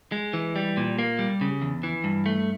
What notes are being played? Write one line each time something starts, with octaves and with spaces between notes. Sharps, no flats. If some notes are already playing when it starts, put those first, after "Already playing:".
G#3
E3
G3
A#2
A#3
G3
C#3
E2
E3
G2
A3